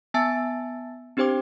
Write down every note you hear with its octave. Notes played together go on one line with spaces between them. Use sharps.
B3 E5 G#5 A5 E6 A6
C4 D4 G4 C5 G5 D6